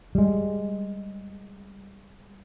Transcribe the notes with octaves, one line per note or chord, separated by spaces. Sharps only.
G3 G#3